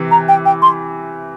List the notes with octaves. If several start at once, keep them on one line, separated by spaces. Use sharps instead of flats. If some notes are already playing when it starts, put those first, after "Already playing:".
Already playing: C3 E3
A#5
G5
G5
C6